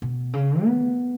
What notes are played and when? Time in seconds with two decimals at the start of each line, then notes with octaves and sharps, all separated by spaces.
0.02 B2
0.33 C#3
0.65 B3